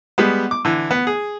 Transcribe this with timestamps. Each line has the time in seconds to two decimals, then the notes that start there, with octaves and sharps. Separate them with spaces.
0.18 G3 G#3 B3
0.51 D6
0.65 D3 E3
0.91 B3
1.07 G#4